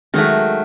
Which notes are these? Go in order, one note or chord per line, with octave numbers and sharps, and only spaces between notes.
D#3 F#3 G#3 A3